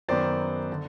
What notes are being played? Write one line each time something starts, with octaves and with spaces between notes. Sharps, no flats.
F#2 D#3 F#3 B3 C5 D5
D3